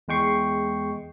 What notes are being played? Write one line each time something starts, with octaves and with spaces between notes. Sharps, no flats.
E2 G#3 G5 C#6 C7